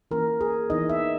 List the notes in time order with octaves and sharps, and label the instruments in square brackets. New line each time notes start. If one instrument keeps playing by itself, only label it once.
[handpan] E3 A#3 C#4 A#4
G#4
E3 B3 D#4 D#5
E5